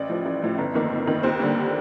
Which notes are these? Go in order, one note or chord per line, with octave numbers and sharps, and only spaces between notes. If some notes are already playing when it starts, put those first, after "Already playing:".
Already playing: A1 D5
A2 F3
A1
A2 F3
G1
F2 D#3 A#3
G1
F2 D#3 A#3
D#2 C5
D3 G3 A#3